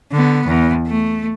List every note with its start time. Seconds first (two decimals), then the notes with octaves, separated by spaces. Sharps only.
0.12 D3 B3
0.47 E2
0.87 A3